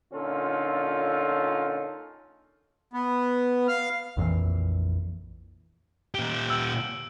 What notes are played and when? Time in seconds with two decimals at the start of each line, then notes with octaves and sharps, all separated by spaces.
0.13 A#2 D3 C#4 D#4 F4 A4
2.93 B3
3.68 F5
4.17 A#1 F2 A#2 E3
6.15 A#2 G4 D7
6.50 E6